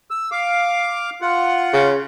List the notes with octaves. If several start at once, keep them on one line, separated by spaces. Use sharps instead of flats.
E6
F5 D6
F4 F#5
C#3